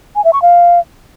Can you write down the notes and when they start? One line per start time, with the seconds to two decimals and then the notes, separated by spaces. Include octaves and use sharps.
0.16 G#5
0.24 E5
0.33 C#6
0.42 F5